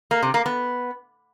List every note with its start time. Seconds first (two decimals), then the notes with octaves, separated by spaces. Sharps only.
0.11 A#3
0.23 C3
0.34 A#3
0.46 B3